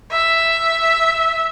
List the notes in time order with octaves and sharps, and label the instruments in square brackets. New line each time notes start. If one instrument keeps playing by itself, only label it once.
[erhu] E5